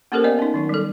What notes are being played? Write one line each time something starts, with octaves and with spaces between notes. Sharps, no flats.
A#3 C#4 G4 A4 A#4 C5
B3 D5 D#5 F5
C#4 D#4
D#3 F#3 D#4
G3 A4